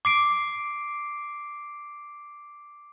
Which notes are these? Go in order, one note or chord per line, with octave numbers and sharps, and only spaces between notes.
D6 C7 D7